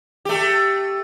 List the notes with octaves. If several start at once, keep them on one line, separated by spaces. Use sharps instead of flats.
A3 G4